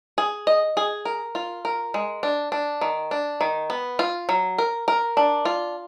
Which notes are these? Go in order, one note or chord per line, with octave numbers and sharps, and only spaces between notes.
G#4
D#5
G#4
A#4
F4
A#4
G#3
D4
D4
D#3
D4
D#3
B3
F4
F#3
A#4
A#4
D4
F4